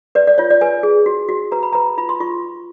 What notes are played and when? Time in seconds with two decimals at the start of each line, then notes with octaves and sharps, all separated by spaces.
0.15 B4 D5
0.27 D5
0.38 F4 C#5
0.50 D5
0.61 B4 G#5
0.83 G#4
1.06 F#4
1.29 F#4
1.52 B4 A#5
1.63 B5
1.73 B4 A#5
1.98 F4 B5
2.09 C6
2.20 F4 C#6